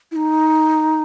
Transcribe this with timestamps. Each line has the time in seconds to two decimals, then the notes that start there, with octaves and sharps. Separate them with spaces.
0.11 E4
0.16 D#4